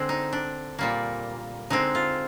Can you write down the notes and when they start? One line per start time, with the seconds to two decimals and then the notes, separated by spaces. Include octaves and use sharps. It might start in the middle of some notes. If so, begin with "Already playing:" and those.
Already playing: D3 G#3 C4
0.09 D#4
0.33 D4
0.79 A#2 G3 A#3
1.70 D3 G#3 C4 D#4
1.95 F4